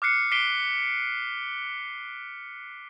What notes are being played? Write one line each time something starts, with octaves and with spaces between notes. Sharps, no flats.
D6 F6 F#6 C7 C#7
D6 B6 C7 D7 D#7 G7